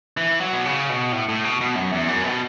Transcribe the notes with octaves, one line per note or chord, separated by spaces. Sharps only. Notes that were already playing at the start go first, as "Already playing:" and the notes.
E3
F#3
B2
C#3
B2
A2
A2
B2
B2
F#2
E2
F#2
B2